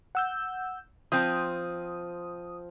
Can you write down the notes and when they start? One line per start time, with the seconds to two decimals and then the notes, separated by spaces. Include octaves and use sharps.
0.15 F#5 E6 G6
1.12 F3 C4 D#6